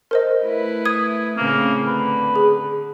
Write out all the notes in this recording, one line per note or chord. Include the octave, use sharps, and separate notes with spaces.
A#4 C5 D#5
A3 E4 B4
D#6 G#6 D#7
A2 C#3 A#3 C4
D3 B4
G#4